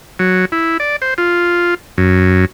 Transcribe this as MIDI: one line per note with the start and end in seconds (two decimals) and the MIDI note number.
0.19 0.45 54
0.52 0.77 64
0.80 0.96 74
1.02 1.14 72
1.18 1.74 65
1.98 2.45 42